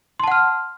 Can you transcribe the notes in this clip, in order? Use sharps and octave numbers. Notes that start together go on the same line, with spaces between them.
F#5 A5 C6 F6